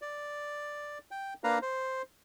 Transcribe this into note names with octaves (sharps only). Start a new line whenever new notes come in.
D5
G5
A#3 D4 B4 F5 A#5
C5